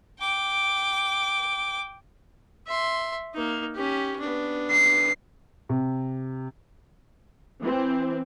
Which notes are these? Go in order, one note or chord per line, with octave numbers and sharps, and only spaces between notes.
G5 D6
E5 C6
A#3 D#4
C#4 G4
B3 D4
C7
C3
E3 C4